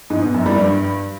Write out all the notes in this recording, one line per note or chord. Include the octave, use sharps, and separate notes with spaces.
G#2
B2
F#2
G3
G2